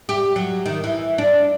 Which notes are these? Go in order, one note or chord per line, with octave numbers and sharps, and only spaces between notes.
G4
F#3
D#3
E3
D4